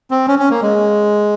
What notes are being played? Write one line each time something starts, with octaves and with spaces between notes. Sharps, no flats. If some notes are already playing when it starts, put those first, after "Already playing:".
C4
C#4
C#4
A#3
G#3